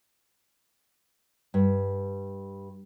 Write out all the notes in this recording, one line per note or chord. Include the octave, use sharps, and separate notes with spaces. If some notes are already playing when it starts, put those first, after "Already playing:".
G2